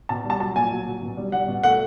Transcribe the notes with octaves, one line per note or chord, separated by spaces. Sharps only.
B2 A5
G3
A5
F#3 A5
A#2 G#5
F#3
F#3
B2
G3
G3 F#5
B2
A3 F#5